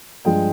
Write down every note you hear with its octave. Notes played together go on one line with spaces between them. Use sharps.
G2 F3 G#3 G5